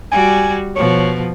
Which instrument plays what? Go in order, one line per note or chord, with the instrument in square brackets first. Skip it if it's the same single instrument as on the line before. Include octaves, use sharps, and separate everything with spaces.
[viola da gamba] G3 F#4 [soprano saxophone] G#5
[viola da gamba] B2 F3 [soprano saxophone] C#5